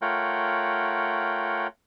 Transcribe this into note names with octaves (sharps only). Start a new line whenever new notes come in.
A3 F4 A#4 C#5 F#5 G5